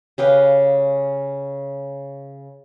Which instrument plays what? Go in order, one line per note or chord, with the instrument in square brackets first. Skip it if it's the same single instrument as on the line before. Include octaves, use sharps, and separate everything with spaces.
[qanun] C#3 G4 B4 F5